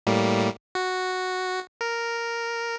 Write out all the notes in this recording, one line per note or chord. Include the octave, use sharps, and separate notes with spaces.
A2 G3 A#3
F#4
A#4